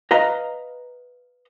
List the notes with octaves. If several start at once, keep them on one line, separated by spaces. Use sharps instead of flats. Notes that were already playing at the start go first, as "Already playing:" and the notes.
B4 D#5 F5 A#5